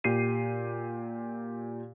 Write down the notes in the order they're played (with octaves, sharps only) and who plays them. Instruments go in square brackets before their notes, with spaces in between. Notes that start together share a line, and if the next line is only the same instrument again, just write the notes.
[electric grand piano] A#2 G4 C7 D#7